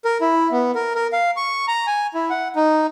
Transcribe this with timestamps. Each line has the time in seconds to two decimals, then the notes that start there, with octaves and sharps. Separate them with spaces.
0.05 A#4
0.21 E4
0.52 B3
0.75 A#4
0.95 A#4
1.13 F5
1.37 C#6
1.68 A#5
1.87 G#5
2.14 E4
2.30 F#5
2.56 D#4